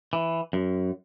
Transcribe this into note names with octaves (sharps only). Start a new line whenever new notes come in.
E3
F#2